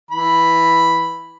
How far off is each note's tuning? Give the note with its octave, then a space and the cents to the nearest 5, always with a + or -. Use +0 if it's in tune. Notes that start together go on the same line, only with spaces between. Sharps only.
E3 +0 B5 +0